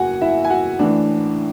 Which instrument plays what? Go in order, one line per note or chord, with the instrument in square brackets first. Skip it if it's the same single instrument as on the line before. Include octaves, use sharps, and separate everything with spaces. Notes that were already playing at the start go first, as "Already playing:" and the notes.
Already playing: [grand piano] F#1 E2 F#4 F#5 G#5
E4 E5
G#5
F#4 F#5
A1 A2 E3 D4 D5